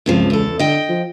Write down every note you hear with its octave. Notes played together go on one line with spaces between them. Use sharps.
C#2 G2 C3 F3
E2 A4
D3 D#5 G5
F3